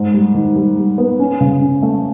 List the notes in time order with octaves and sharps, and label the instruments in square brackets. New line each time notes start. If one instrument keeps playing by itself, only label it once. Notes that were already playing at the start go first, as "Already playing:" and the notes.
Already playing: [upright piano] G#2
G3
D#3
G3
G3
B3
C#4
C#3
C#4
A3